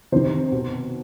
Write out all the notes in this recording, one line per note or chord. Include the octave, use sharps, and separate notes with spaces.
C3 D#3 C5
B2